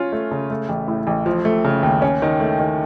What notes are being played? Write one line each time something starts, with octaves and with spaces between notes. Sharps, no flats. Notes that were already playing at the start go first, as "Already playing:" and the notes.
Already playing: C#4 F4
A3
C#3
A3
A1
A2
A1
F3
A3
C#3
D#2
C#4
D#3
A3
D#3